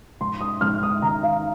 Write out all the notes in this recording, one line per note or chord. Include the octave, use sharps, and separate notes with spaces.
G#2 C6
D#6
G#2 F6
D#6
D#3 A#5
F5